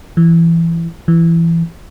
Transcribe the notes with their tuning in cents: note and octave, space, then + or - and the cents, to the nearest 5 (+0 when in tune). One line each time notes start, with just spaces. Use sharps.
E3 +20
E3 +20